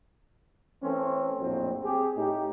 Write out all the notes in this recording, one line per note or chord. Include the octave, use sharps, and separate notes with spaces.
E3 A3 C4 C#4
A#1 F2 A2 F#3 C4
C4 G4 G#4
A2 D#4 G4